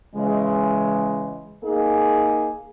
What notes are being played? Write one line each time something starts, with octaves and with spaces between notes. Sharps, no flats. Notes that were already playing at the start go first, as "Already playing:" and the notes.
C#3 E3 G#3
A#3 D#4 G#4